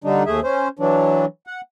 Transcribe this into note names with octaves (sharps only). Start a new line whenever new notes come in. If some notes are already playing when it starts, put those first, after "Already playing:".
D3 G3 D4 D#4
D#2 A3 G#4 E5
C#4 C5
E3 F#3 D4
F#5